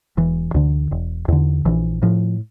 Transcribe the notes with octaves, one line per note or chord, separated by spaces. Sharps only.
E1 E3
D2 D3
E1
E2 D3
A#1 E3
A2 F3